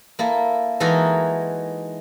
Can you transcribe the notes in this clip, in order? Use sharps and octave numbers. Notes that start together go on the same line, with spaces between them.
A#3 E4 A4
E3 G#3 D#4 F#4 A4 A#4